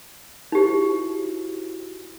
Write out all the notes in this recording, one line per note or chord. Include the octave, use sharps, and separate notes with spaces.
D#4 E4 F#4 G4 C5